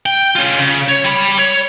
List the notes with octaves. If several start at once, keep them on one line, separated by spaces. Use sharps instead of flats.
G5
C#4 F4
C#3
C#5
G3 B5
C#5